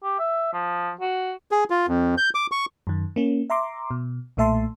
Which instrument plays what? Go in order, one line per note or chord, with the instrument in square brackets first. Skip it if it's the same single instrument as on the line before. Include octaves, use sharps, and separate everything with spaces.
[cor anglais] G4
E5
F3
F#4
[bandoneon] G#4
F4
F2
G6
D6
C#6
[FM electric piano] F#2 D#3
A#3 C#4
E5 A#5 C6 D6
B2
B1 A#2 A3 E5 A5 C6